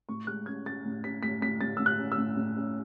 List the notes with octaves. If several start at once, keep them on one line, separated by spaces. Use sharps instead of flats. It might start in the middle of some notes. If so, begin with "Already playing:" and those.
A2 C#6
G#3 F#6
C#4 G#6
C#4 A6
A2
C#4 B6
A2 B6
A2 B6
A2 A6
A2 E6
F#6
C#4
E6
A2
A2
C#4